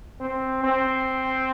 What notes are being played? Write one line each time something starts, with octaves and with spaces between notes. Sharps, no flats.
C4
C4